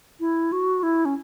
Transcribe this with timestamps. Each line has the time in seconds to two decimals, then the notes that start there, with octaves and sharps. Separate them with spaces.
0.20 E4
0.52 F#4
0.83 E4
1.05 C#4